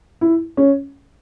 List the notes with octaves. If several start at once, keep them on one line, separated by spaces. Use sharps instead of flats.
E4
C#4